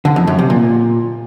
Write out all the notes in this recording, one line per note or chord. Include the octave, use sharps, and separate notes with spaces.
D3
F2
F#2
C3
A#2